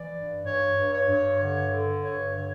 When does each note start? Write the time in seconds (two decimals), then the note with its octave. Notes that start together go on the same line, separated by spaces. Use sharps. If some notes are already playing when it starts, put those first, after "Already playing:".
Already playing: E3 D5
0.15 G2
0.46 G2 C#5
0.77 G2
0.93 C#5
1.08 G2
1.40 D3 C#5
1.71 D3
2.03 G2 C#5
2.34 D3 C#5